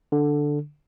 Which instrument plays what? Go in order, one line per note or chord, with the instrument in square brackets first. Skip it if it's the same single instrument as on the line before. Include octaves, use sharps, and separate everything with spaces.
[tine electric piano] D3